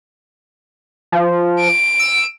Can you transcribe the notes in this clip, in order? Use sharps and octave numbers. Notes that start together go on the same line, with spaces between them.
F3
D7
E6